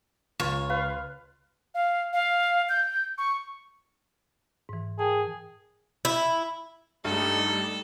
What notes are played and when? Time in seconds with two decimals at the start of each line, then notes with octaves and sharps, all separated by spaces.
0.40 C#2 F4 C#5
0.70 B4 F5
1.75 F5
2.13 F5
2.69 G6
3.18 C#6
4.69 G#2 E3
4.99 G#4 A#4 G5 A5
6.05 E4
7.05 G2 G3 A3 D#4 A4